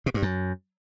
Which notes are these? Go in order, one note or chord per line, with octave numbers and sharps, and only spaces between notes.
B2
G2
F#2